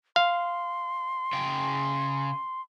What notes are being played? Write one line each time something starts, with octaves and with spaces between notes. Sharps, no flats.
F5 C6
C#3 G5